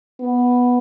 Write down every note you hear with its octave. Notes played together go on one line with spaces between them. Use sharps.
B3